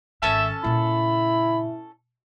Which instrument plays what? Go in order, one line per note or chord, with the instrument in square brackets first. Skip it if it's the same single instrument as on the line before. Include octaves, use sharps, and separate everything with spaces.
[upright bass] G#1 D#3 [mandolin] C#4 A4 A5 [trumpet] E5
[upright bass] A#2 C#3 [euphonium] E4 [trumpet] B5